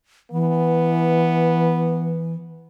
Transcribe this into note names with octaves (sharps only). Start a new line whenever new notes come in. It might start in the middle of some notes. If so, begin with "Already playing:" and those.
E3 B3